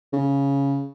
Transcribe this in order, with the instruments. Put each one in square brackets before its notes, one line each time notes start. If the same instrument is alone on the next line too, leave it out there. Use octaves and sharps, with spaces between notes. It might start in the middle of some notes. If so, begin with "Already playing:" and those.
[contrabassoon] C#3